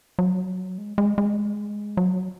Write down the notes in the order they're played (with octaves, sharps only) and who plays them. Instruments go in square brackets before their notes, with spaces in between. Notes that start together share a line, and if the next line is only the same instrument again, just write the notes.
[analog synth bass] F#3
G#3
G#3
G#3
F#3